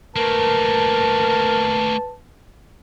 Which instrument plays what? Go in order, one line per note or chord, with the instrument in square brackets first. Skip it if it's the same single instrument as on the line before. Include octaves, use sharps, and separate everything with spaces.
[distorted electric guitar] A3 A#3 [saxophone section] A#4 [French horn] B4 [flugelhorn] A5